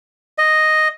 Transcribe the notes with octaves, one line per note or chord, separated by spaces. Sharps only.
D#5